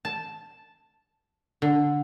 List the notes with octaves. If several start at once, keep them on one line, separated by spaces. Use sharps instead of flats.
A5
D3